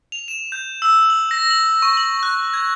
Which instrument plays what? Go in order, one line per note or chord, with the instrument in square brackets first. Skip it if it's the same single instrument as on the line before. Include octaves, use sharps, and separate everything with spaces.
[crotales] F7
E7
G6
E6
F#7
A#6
F#7
C#6
F#7
F#6
G#6